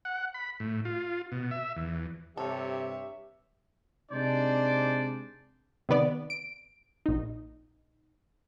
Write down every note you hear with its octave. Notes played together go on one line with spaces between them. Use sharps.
F#5
B5
A2
F4
B2
E5
E2
G2 C3 G4 A4 C#5 E5
C3 G#3 D4 D#4 C5 D5
C3 D#3 B3 D5
D7
A#1 D#4